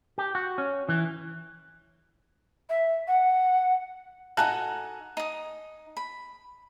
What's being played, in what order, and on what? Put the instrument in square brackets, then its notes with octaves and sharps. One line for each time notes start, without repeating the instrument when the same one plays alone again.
[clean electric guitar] G4
F#4
C#4
E3
[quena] E5
F#5
[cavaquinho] D#4 F#4 A4 [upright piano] G#5 A#5 F#6
[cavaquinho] D#4 D#6
B5